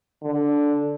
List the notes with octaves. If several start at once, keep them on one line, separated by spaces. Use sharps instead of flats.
D3